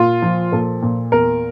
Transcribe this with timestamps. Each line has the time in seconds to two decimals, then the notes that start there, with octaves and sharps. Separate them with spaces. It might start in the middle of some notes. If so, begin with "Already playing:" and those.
Already playing: A#2 F4
0.22 F3
0.52 A#2 A4
0.82 A#2
1.12 E2 A#4